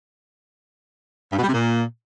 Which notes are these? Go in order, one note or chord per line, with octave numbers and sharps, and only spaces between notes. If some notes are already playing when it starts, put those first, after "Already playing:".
G2
B2
G3
C3
A#2